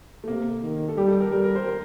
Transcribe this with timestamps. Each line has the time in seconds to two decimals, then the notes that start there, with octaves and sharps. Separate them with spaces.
0.24 A3
0.28 C3 A#3
0.62 D#3
0.89 A4
0.97 G3 G4
1.08 A4
1.21 A#4
1.32 G3 A#4
1.44 A#4
1.55 C5
1.66 A#4